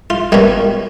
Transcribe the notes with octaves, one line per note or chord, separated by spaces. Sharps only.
F4
B2 G3 A#3 C#4